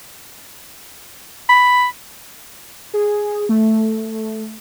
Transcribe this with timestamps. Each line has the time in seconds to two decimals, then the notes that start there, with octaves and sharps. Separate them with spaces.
1.49 B5
2.94 G#4
3.49 A3